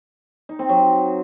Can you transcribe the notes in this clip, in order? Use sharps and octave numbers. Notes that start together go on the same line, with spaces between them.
D#4
C4
F#3